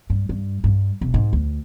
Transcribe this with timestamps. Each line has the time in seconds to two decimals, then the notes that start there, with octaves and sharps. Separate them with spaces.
0.10 G2
0.29 G2
0.64 G2
1.01 E1
1.14 G#2
1.33 D2